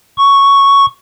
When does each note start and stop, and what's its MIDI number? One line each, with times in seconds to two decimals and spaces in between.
0.18 0.86 85